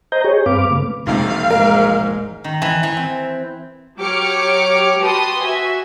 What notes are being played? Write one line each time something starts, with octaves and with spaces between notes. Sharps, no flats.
C5 D#5 A#5 G6
G4 G#4 C#5
G2 C4 B4 F5 D6
C#3 A3
E1 A#1 G#2 C3 A3 F5
G#2 A#4
D#3
E3
E3
C4
F#3 G4 C#5 D6 F6 C#7
F#4 G4 B4 A5 C6 D#6
F#4 E5 G#5